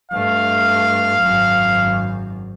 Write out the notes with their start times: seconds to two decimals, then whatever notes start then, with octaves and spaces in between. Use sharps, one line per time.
0.11 G2 A3 F5
1.21 G#1 F#2